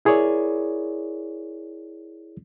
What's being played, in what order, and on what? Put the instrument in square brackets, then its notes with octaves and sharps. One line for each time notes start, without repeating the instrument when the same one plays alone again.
[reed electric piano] E4 G#4 A#4 C#5 D5